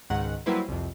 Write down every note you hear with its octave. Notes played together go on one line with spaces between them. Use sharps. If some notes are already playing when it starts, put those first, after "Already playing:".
C#2 G#2 D#3 F#5
F#3 G3 A#3 E4 B4 C5
C2 F2